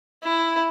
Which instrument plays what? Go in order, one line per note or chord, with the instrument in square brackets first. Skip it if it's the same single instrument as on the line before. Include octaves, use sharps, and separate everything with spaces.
[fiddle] E4